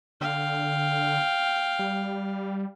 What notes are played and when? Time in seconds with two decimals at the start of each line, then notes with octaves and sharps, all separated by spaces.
0.21 D3 F5 G5
1.79 G3